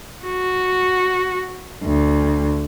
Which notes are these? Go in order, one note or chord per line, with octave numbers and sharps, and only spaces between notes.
F#4
D2